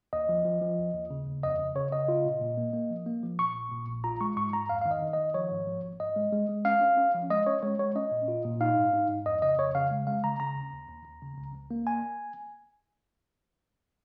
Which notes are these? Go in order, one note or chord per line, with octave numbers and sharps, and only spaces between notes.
D#2 D#5
F3
F3
F3
D#2
D#2
C#3
D#2
F2 D#5
C#3
C#3 C#5
C#3 D#5
F4
A#2
A#2
A#3
A#3
F3
A#3
F3
A#2 C#6
A#1
A#2
A#1
F4 A#5
G#3 C#6
G#2 C#6
G#2 A#5
F2 F5
D#3 F5
D#5
D#3
D#5
D#3
F3 C#5
G#2
F3
G#1
G#2 D#5
G#3
G#3
G#3
C#4 F5
C#4
C#4
F3
G#3 D#5
C#4 C#5
G#3 C#5
G#3 C#5
C#4 D#5
A#2
F4
A#2
D#4 F5
G#2
D#4
G#2
F2 D#5
C#3 D#5
F2 C#5
C#3 F5
G#3
G#3 F5
C#3 A#5
C#3 A#5
D#2
D#2
D#2
D#2
C#3
C#2
C#2
A#3
G#5